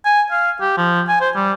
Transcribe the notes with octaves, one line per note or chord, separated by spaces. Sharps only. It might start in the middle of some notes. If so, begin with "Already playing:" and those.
G#5
F5
G4
F3
G#5
C5
G3